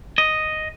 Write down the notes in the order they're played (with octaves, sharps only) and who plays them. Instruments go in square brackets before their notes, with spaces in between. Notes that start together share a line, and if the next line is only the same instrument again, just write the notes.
[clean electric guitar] D#5